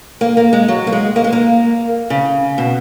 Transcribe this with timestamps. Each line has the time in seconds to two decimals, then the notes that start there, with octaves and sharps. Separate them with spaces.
0.21 A#3
0.37 A#3
0.53 G#3
0.68 F#3
0.87 A#3
0.92 G#3
1.16 A#3
1.24 G#3
1.32 A#3
2.10 C#3
2.58 B2